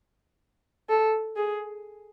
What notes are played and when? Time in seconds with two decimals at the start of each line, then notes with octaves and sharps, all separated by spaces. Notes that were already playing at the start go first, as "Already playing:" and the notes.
0.89 A4
1.37 G#4